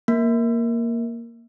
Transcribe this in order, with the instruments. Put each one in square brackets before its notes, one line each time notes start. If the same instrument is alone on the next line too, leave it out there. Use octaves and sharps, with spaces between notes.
[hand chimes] A#3